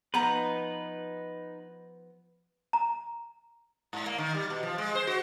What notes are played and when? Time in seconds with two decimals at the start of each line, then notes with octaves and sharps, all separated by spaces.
0.14 F3 B3 D#4 B4 A#5
2.73 A#5
3.93 G#2
4.06 A#3
4.18 D#3
4.35 G3
4.50 B2
4.63 F3
4.78 G#3
4.95 C5
5.07 F#4